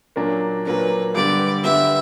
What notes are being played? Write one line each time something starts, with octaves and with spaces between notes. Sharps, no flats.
A#2 F#3 A#3 D4
A#2 F#3 A#3 D4 B4
G2 D3 G3 B3 D5
G2 D3 G3 B3 E5